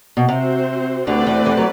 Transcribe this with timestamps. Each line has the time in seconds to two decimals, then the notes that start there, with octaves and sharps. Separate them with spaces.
0.17 B2
0.29 C3 C4 F#4 C5
1.07 D2 D3 A3 C4 G4 B4 D5
1.26 E2 E3
1.45 E2 E3
1.57 F#3